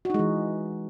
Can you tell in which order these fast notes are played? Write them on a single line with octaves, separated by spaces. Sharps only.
F#4 D#4 G#3 E3